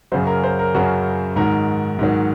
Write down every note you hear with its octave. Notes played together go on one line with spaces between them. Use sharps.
F#2 C#3 F#3 C5
A#4
C5
A#4
F#2 C#3 F#3 F#4
G#2 D#3 F#3 A#4
G#2 D#3 F#3